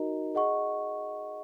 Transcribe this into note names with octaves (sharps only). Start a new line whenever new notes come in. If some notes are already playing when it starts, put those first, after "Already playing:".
Already playing: D#4 F#4 A#4 D#5 A#5
G#4 D#5 F#5 C#6